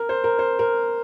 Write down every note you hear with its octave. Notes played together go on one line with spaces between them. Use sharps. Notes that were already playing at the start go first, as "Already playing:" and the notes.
Already playing: A#4
C5
A#4
C5
A#4